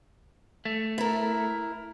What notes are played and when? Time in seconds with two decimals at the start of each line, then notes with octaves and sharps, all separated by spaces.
0.65 A3
0.98 E4 A#4